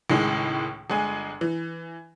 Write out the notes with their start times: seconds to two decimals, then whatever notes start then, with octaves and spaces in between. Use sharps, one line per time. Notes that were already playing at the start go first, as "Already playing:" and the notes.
0.10 C#2 A2 D#3 G#3
0.90 G1 G#3 G#5
1.41 E3